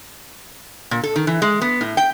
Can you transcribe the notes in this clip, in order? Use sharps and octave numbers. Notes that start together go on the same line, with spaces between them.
A#2
A4
D#3
E3
G#3
B3
A2
G5